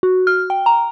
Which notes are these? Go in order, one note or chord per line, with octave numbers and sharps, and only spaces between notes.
F#4
F6
G5
A#5